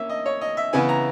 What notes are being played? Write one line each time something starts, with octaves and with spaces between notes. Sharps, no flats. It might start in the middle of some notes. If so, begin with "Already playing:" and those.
Already playing: A#3 C#4 E5
D#5
C#5
D#5
E5
C#3 E3 B3 E4 G#5
A#5